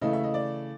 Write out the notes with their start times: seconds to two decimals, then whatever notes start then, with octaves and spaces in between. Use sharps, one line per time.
0.01 C#3 E3 A3 D#5
0.13 E5
0.24 D#5
0.34 D5